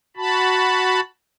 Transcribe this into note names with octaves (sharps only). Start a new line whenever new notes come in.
F#4 A5 B5